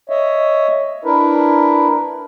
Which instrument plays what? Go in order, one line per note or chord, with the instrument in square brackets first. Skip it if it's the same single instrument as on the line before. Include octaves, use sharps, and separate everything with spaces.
[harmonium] C#5 D#5 E5
D4 E4 A#4 B4